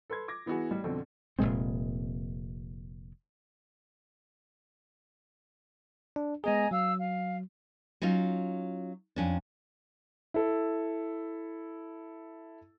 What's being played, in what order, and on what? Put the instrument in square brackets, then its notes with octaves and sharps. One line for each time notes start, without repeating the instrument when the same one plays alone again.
[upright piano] A4 B4 C6 G#6
D6 G#6 A#6
E3 B3 E4 F#4 G#4
A1 G3
F2 B2 D3 C4
[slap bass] F1 A#2 G#3 C4
[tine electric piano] D4
[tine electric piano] G#3 B3 G#4 [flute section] D#5 G#5 A#5
[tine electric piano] F#3 [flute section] F5 E6
[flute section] F5
[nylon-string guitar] F#3 C#4 D#4 F4
F2 C#4 D4
[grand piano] E4 A4